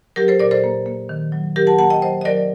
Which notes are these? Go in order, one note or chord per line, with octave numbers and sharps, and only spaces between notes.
F#3 G4 A#4
A4 C5
A#2 A#4 D5
A4 C5
A#3
A#3
D#3
F#3
F#3 G4 A#4
F#5 A5
A#3 F#5 A5
D#5 G5
F#3 C5 D#5
D#5
F#3 A#4 D5